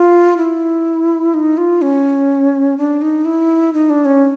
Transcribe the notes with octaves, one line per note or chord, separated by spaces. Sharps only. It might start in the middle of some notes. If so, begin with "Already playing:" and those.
Already playing: F4
E4
D#4
F4
C#4
D4
D#4
E4
D#4
D4
C#4